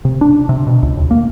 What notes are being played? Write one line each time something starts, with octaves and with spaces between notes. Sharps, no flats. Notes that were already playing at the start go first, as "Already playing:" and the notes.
C3
D4
C3
B2
C#2
D#2
A#3